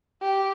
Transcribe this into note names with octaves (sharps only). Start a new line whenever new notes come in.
G4